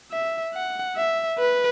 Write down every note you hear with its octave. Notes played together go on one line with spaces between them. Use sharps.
E5
F#5
E5
B4